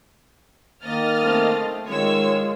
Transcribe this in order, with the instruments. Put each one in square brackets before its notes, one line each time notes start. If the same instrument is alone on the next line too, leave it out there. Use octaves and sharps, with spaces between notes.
[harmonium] D#3 A#3 [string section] D#5 F6 A6
[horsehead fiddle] A3 C4
[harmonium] D#3 [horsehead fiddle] G#3 F4 [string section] C#5 E6